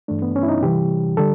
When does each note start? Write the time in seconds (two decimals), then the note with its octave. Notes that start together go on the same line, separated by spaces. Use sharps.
0.08 G2 E3 A3 D4
0.22 B3
0.36 C#4
0.43 E4
0.49 D#4
0.62 C3 E3 G3 G4
1.17 D3 G3 A4